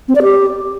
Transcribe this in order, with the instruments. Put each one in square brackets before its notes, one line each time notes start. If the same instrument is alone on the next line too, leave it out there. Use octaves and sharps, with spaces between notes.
[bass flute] C4
D5
G4